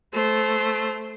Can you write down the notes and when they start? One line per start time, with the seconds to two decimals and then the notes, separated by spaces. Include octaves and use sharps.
0.14 A3 C5